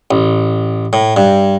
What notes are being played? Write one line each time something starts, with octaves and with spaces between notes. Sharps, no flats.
A1
A2
G2